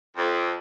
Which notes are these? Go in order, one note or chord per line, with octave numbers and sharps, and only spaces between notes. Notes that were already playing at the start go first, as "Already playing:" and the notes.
F2